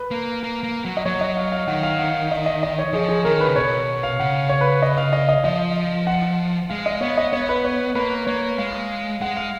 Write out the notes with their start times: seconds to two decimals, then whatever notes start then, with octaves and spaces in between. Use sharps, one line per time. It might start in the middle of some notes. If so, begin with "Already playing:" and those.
Already playing: B4
0.11 A#3
0.43 A#3
0.63 A#3
0.85 F#3
0.97 D#5
1.05 F#3 C#5
1.21 D#5
1.37 F5
1.52 F5
1.68 D#3 F#5
1.83 F5
1.99 F#5
2.31 D#5
2.46 D#5
2.63 D#5
2.79 C#5
2.93 F3 G#4
3.09 G#4
3.25 D#3 A#4
3.40 B4
3.48 C#3
3.56 B2 C#5
4.03 F5
4.20 C#3 F#5
4.49 C#5
4.61 B4
4.82 D#5
4.98 F5
5.13 D#5
5.29 D#5
5.44 F3 D#5
6.07 F#5
6.70 G#3 F5
6.86 D#5
7.01 B3 C#5
7.18 D#5
7.32 B3 C#5
7.49 B4
7.65 C#5
7.95 A#3 B4
8.27 A#3 C#5
8.58 G#3 F5
9.21 G#3 F#5
9.37 F5